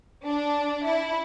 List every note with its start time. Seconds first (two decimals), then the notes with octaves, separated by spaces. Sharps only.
0.25 D4
0.86 E4